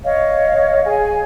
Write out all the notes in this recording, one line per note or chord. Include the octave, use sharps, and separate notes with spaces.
C#5 D#5 F5
G#4 G#5